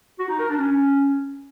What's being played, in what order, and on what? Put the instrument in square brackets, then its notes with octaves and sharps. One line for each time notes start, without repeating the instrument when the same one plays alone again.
[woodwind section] F#4
D#4
A#4
D4
C#4